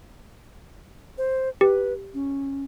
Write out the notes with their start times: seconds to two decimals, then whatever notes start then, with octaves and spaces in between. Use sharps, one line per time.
1.18 C5
1.61 G4 B4
2.14 C#4